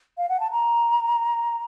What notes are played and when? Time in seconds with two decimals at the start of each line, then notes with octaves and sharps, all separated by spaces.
0.18 F5
0.29 F#5
0.40 A5
0.52 A#5